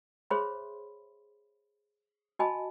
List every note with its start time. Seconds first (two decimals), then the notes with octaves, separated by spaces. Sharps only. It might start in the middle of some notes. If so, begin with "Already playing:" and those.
0.30 G#4 C5 C#5 E5 B5 C6
2.39 F#4 D#5 G#5 A5 B5